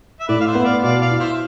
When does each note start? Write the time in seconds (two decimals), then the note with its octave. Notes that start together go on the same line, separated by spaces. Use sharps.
0.20 E5
0.28 A2 B4 D5
0.40 F5
0.46 C5 E5
0.55 B3
0.64 D5 F5
0.83 B2 D5 F5
1.01 D5 F5
1.11 E4
1.19 C5 E5